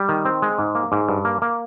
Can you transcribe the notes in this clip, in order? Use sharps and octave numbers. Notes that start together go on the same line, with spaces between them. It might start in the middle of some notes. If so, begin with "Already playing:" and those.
Already playing: G3
D#3
C4
G#3
G#2
A#3
G#2
G2
A#3
A#3